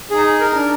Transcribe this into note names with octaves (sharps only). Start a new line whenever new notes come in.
D#4 G#4
A#4
D4